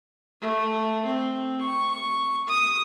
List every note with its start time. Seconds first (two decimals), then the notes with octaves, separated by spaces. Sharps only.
0.42 A3
1.05 C4
1.61 C#6
2.47 D#6